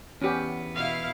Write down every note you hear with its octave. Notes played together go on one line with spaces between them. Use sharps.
E2 B3 C#4 G4
B2 E4 F5